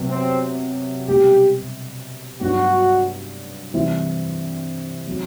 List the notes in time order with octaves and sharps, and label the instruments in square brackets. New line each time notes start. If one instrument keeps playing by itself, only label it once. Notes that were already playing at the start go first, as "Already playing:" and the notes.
Already playing: [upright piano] C3 F#3 B3
[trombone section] C4
[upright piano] B2 G3 C4 [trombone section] G4
[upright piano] G2 F#3 B3 [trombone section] F#4
[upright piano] C3 E3 G3 C4 E4
F#3 C4 F#4